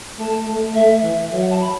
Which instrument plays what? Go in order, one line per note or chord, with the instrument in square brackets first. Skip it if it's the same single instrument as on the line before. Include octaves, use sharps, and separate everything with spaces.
[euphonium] A3 [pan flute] A5
[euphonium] A3
[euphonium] A3 [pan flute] E5
[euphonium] E3
[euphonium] F#3 [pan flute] E5
[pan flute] F#5
A5
B5